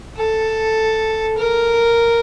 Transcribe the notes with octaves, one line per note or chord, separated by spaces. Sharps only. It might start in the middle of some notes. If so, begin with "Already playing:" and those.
A4
A#4